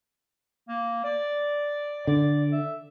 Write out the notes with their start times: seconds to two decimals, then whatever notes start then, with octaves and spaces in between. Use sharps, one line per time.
0.69 A#3
1.04 D5
2.07 D3 D5
2.52 E5